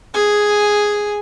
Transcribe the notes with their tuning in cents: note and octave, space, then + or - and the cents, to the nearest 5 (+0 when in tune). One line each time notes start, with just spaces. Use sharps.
G#4 +0 G#5 +0